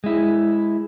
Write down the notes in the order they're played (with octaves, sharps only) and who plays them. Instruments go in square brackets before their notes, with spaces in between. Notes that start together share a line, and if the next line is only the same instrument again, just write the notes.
[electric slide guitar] G#3 E4